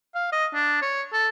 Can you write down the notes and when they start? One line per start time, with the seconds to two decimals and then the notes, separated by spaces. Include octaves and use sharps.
0.15 F5
0.32 D#5
0.54 D4
0.82 C#5
1.13 A4